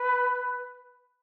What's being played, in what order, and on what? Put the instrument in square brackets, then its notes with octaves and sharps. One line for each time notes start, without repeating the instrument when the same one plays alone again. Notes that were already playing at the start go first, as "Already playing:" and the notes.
Already playing: [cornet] B4